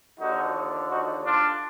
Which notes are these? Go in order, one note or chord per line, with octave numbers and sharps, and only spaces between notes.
D#2 D3 F3 D#4 F#4
D#4 F#4
D4 F4